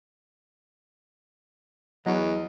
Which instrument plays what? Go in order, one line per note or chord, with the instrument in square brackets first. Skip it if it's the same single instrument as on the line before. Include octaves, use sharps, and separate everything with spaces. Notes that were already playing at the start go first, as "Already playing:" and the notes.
[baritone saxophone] E2 [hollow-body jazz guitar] F#3 [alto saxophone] D#5